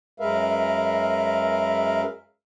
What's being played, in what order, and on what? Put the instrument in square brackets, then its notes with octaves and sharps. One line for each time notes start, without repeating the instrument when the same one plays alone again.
[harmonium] F#2 G#3 A#4 B4 E5 F5